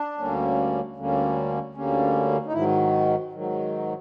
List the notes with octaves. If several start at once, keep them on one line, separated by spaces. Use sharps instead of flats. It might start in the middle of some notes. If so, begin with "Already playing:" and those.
Already playing: D4
D2 D3 G3 A#3 C#4
D2 D3 G3 A#3 C#4
D2 D3 G3 A#3 C#4
D#4
G#2 D#3 F#3 E4
G#2 D#3 F#3